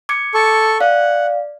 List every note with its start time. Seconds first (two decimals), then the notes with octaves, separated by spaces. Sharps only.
0.09 D6 G#6 C#7
0.34 A4 C#6
0.81 D5 F5 F#5